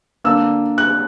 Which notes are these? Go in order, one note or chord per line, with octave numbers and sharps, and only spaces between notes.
D3 A#3 D4 E6
F#6